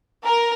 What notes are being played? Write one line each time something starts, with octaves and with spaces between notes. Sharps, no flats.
A#4